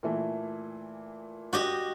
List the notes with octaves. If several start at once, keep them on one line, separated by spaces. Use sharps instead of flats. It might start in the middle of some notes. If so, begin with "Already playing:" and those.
A#2 E3 A3
F#4 G4 D#5